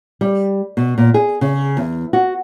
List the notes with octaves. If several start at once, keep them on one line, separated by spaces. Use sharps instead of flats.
G3
B2
A#2
G#4
C#3
E2
F#4